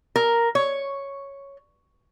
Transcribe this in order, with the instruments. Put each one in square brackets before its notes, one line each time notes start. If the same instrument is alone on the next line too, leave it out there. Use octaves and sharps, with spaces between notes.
[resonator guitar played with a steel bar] A#4
C#5